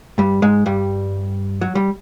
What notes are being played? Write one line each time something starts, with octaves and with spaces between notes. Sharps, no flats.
G2 G3
G#2 G#3
G2 G3
F#3
G3